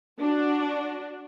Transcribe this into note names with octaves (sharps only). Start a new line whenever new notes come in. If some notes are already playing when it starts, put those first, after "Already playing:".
D4 F#4